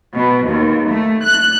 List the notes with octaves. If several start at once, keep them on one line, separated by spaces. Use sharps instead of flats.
B2
D#2
A3
F#6